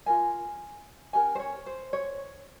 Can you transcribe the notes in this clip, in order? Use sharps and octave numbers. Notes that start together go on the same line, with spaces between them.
F4 A#4 G#5
C#4 G4 A#4 G#5
C5
C#5
C5
C#5